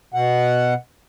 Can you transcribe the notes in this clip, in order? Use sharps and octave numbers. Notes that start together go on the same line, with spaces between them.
B2 F#5